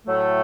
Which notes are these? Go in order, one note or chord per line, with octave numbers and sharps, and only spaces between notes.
A2 F#3 A3